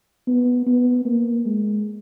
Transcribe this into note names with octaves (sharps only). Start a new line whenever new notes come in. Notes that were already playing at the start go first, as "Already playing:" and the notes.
B3
B3
A#3
G#3